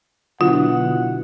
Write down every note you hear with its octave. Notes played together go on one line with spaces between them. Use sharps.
B2 D3 F#3 E4 F4 F#5